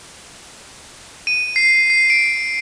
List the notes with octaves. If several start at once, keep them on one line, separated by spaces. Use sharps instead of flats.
D#7
C7
C7
D7